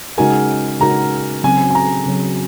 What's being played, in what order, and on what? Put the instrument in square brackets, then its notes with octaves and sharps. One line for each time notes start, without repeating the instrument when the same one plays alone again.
[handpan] C#3 G#3 D#4 F#4 A#4 [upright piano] G#5
[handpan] C#3 G#3 D#4 F#4 A#4 [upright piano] A#5
[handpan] C#3 F#3 C4 [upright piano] G#5
[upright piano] G#5
A#5
[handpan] C#3 F#3 C4